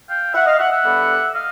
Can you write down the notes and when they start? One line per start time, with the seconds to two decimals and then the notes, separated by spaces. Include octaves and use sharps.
0.09 F5 G5
0.34 E5 F#5
0.47 D#5 F5
0.59 E5 F#5
0.71 E5 F#5
0.84 D3 G3 B3
1.34 D#5 F5